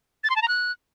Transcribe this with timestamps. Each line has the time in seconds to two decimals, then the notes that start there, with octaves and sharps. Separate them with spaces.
0.24 A6
0.30 C6
0.36 A5
0.42 A#5
0.48 F#6